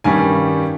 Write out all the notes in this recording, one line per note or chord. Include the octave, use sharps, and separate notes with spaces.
G2 D#3 G3 C#4 G#5